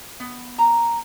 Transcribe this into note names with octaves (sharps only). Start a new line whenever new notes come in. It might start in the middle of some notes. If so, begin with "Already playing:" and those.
B3
A#5